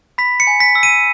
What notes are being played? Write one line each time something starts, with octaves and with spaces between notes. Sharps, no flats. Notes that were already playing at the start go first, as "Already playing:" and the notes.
B5 B6
C#7
G#5
B6
E6
D#7